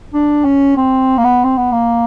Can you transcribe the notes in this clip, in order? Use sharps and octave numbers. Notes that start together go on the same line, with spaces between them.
D4
C#4
C4
A#3
B3
C4
B3
A#3